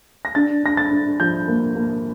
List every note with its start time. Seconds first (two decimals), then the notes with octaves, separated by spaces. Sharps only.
0.25 A#6
0.35 D4 A6
0.63 D4 A#6
0.77 A6
0.91 D4
1.20 F3 G6
1.48 A#3
1.76 A#3